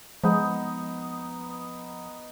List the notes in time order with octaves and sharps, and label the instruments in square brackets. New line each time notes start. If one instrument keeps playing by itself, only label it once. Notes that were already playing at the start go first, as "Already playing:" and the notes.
[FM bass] F3 [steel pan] G#3 [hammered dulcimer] B3 D#4